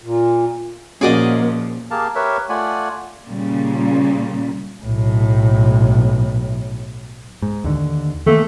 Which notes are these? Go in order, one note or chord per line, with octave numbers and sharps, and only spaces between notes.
A#2
A#2 F3 A#3 C#4 F#4 G#4 D5 D#5
A#3 G4 G#4 A#4 F5 A5
G4 A#4 B4 C#5 E5
A3 F4 D5 F#5 G#5
A#2 C#3 G3 A#3
B1 A2
G#2
D#2 D3
D#3 E3 A3 A#3